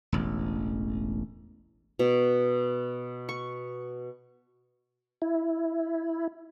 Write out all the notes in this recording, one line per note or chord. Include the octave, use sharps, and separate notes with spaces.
E1 A1
B2
C#6
E4